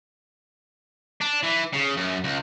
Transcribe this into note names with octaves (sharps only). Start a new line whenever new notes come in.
D4
E3
C#3
F#2
C#2